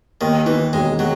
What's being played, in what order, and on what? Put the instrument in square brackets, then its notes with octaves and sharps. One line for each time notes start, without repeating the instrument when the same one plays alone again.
[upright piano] D#2 [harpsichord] D#3
[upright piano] D#3 [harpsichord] E3
[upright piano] E1 [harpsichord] G#3
[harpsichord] F#3 [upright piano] G#3